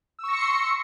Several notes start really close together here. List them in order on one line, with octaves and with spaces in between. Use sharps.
E6 C#6 A#6 C#7 C6